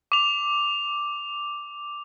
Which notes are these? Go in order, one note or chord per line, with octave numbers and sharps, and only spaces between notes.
D6 F7